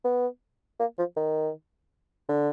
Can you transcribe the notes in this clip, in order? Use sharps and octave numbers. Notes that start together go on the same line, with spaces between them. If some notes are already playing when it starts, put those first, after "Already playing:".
B3
A#3
F3
D#3
D3